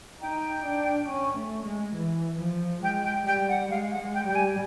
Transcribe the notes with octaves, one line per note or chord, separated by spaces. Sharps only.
D#4 G5
D4
C#4
A3
G#3
E3
F3
G#3 G5
G5
G3 G5
F#5
G#3 F5
F#5
G#3
G5
G3 G5
G#5